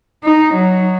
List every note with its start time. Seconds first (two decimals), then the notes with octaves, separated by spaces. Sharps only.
0.25 D#4
0.54 F#3